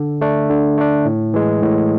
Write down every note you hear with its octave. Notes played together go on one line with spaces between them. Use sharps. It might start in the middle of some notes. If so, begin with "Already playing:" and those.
Already playing: D3
A3 D4
D3
A3 D4
A2
E3 G#3
A2